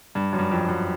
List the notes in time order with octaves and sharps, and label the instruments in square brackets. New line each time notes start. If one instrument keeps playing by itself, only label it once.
[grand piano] G2
F#2
G2
F2
F#2